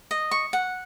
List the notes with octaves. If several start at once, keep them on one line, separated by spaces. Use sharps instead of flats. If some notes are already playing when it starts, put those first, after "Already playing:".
D#5
C#6
F#5